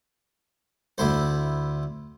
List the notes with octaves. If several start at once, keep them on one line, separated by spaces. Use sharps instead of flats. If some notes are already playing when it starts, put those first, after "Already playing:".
D2 E4 C5